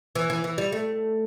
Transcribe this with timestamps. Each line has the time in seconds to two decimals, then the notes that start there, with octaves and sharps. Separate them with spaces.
0.15 E3
0.30 E3
0.44 E3
0.58 G3
0.72 A3